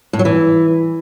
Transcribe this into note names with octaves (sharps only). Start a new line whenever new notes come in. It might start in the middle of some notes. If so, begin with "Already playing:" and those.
A2
F#3
E3